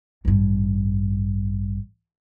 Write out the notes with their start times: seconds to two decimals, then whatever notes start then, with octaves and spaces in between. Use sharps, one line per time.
0.25 A1 G2